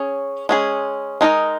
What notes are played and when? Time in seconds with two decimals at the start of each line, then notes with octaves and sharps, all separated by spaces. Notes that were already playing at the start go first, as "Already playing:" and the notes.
Already playing: C#4 G#4
0.49 G#3 C#4 G#4
1.21 G#3 D#4 A#4 D#5